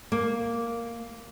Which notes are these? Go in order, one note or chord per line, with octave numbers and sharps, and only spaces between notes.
A#3